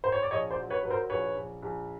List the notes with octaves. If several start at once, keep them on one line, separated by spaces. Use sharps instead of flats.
C5
C#5
D5
A#1 C#5 D#5
C5 D5
F#3
B4 C#5
F#3 B4
A#4 C5
A#1 B4 C#5
A#1
A#1